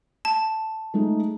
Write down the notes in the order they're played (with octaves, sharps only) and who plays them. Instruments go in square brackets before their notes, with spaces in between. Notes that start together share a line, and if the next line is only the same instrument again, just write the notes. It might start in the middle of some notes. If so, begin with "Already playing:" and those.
[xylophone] A5
[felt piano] G#3 A3 D#4